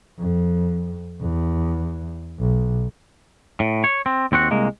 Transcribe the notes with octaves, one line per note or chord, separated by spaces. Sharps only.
F2
E2
B1
A2
C#5
C4
D#2 C4 F#4 F#5
C2 G#3 A#3